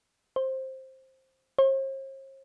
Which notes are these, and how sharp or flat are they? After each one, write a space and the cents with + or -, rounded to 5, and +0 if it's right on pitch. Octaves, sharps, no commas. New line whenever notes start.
C5 +10
C5 +45